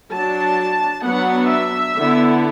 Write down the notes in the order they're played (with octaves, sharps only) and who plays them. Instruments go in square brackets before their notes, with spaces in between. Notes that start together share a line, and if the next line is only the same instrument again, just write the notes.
[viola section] F#3 D4 A5
F#3 B3 D4 F#5
E5
D3 B3 E4